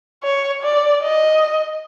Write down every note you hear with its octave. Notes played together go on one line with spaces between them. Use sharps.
C#5
D5
D#5